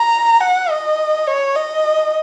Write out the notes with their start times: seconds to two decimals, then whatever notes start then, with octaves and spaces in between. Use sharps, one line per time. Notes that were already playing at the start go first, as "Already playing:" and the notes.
Already playing: A#5
0.41 F#5
0.70 D#5
1.27 C#5
1.55 D#5